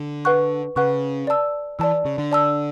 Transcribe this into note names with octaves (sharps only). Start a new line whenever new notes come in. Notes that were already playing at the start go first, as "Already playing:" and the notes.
Already playing: D3
B4 F#5 C#6 F#6
C#3 B4 F#5 C#6 F#6
D5 A5 E6
E3 D5 A5 E6
C#3
D3
D5 A5 E6